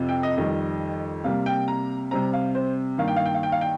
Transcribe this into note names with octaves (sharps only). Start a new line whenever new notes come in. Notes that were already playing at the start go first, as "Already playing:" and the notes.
Already playing: F2 C3 F3
G5
D#5
F2 D#3 G3 D#5
C3 G3 A#3 F5
G5
A#5
C3 G3 C4 A#5
F5
C5
G2 D#3 A#3 F5
G5
F5
G5
F5
G5
F5
G5